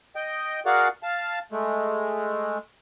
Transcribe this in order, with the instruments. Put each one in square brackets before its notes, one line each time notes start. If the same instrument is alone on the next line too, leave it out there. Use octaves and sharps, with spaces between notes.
[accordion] D#5 G5
F#4 G#4 A#4 D5 F5 F#5
F5 A5
G#3 A3